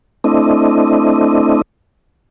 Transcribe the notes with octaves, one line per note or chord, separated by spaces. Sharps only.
A3 C4 D4 E4 D#5